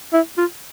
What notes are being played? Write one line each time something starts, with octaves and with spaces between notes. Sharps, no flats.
E4
F4